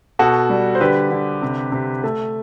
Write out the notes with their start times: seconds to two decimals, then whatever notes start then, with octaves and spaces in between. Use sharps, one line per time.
0.19 B2 F#4 A4
0.50 G3
0.75 C5
0.81 D3 G4 B4
1.11 D3
1.42 C3
1.72 C3
2.04 A3